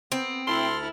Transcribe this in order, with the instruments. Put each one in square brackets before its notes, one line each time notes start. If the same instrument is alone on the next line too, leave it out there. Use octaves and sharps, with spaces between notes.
[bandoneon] B3 [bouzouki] C4
[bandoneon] D2 A4 F6 [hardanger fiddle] E4 [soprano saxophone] C6